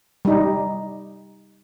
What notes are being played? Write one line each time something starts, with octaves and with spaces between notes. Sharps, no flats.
G3 D#4